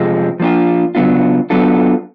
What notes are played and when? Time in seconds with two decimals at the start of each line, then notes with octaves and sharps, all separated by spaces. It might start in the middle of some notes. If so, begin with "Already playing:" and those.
Already playing: F2 C3 F3 G#3 C4
0.40 F3 A#3 D4 F4
0.95 C#3 F#3 B3 D4 F4
1.50 F#3 B3 D4 F4 A4